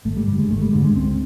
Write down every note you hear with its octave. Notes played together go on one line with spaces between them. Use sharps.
G#1 A3
G3
G2 D3 G3
G#3
G#1 A3
G3
G2 D3 G#3
G#3
C#2 C4